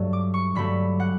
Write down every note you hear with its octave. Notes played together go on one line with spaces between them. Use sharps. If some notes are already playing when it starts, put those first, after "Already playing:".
Already playing: G2 F#3 A3
D6
C#6
G2 F#3 A3 B5
F#5